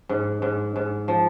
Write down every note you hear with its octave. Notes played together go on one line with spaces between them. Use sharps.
G#2
G#2
G#2
F3